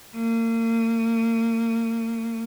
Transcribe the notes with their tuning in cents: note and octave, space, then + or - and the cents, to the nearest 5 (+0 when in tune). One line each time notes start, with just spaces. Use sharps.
A#3 -35